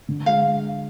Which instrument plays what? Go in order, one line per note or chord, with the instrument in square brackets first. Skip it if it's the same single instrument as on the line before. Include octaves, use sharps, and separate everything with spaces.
[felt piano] D3
[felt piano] G#3 [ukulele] F5